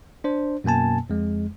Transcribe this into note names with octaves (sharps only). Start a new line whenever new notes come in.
D4 C5
F#2 B2 A#3 G#5 A5
F2 G#3